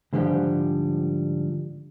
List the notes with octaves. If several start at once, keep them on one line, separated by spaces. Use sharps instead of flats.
G#2 D3 F3 G3 G4